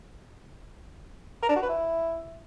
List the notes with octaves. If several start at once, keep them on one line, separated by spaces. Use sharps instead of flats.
A#4
D4
F#4
B4
E4